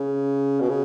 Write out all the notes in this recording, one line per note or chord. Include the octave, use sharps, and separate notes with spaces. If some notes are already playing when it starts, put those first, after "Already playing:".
Already playing: C#3
B2
C#3